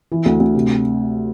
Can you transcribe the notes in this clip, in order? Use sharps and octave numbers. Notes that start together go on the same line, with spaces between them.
E3
D2
D2
C3